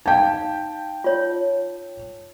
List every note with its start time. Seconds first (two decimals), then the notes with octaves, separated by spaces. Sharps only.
0.06 D#4 F5 G5 A5
1.04 F4 C#5